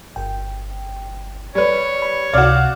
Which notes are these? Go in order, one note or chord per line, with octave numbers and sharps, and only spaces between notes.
G1 G5
G3 B4 C#5
B5
C#2 C3 F#4 D5 F5